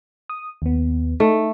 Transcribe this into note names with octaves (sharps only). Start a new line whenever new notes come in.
D#6
D#2 B3
A3 D#4